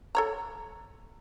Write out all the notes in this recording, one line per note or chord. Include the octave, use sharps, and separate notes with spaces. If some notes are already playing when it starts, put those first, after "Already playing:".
A4 C#5 A#5